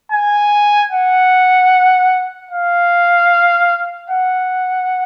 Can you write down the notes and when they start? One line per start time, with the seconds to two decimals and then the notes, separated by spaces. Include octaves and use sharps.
0.12 G#5
0.92 F#5
2.51 F5
4.10 F#5